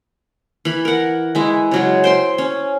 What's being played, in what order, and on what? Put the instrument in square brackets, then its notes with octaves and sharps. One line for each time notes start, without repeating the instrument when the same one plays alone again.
[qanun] E3 B5
A#4 F#5
E3 G#3 E4
C#3 F#3 G#3
C5 G5 C6
C#4